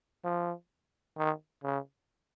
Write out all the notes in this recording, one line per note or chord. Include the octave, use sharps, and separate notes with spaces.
F3
D#3
C#3